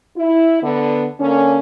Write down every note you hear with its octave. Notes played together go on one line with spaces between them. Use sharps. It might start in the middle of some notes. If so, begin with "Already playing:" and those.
E4
D3 B3
D3 A#3 C#4